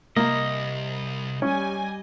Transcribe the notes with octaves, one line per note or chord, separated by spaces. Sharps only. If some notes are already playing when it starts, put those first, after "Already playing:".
C2 A#3 D#5
G3 C#4 G#5